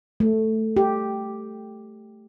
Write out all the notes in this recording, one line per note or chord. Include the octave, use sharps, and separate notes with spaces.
A3
G4